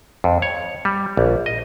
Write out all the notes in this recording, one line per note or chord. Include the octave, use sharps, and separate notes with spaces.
F2
C#5
G3
A#1
D#5